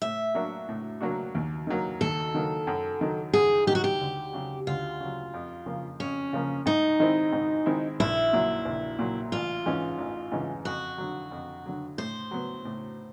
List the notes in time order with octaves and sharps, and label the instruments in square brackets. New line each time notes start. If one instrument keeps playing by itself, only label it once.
[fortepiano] A2 [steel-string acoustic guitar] E5
[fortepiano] F#3 A#3 D4 F#4
A2
F#3 A#3 D4 F#4
D#2
D#3 F#3 A#3
[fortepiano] D#2 [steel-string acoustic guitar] A4
[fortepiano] D#3 F#3 A#3
F#2
D#3 F#3
[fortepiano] F#2 [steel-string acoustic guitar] G#4
[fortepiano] D#3 [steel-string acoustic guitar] G4
[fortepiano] F#3 [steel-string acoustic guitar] F#4
[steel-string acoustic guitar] G4
[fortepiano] D2
C#3 F#3
[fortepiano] D2 [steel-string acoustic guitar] F4
[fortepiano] C#3 F#3
F2
C#3 F3 A#3
[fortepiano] F2 [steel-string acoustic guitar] C#4
[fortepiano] C#3 F3 A#3
[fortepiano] G#2 [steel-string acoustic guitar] D#4
[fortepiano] D#3 G#3 C4 E4
G#2
D#3 G#3 C4 E4
[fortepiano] A#1 [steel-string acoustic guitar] E4
[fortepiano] A#2 F#3
A#1
A#2 F#3
[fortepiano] A1 [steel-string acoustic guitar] F4
[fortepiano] G#2 E3 G#3 C#4
A1
G#2 E3 G#3 C#4
[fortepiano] F2 [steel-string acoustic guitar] F#4
[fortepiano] D3 F#3
F2
D3 F#3
[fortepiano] A2 [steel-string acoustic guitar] C5
[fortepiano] F#3 B3
A2